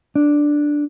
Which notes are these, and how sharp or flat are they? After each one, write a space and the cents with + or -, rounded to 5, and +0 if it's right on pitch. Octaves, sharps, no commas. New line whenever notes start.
D4 +0